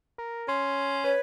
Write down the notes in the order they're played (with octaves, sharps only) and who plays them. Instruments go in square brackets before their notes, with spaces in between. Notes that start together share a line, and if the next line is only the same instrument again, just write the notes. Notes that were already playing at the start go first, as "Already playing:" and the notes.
[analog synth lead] A#4
[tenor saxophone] C#4 [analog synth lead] C6
[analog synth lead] B4 [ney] C#5